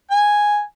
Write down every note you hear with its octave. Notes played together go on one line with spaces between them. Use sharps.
G#5